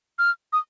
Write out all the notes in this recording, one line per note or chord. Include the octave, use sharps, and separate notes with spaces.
F6
D#6